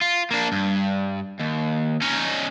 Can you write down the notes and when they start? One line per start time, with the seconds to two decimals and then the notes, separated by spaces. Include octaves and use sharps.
0.01 F4
0.31 A#3 D4
0.52 G2
1.40 D#2
2.02 C#4 D#4